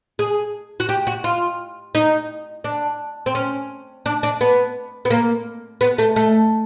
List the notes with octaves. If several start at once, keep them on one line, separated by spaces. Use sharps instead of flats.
G#4
F#4
G4
F#4
F4
D#4
D4
C4
C#4
D4
D4
B3
B3
A#3
B3
A3
A3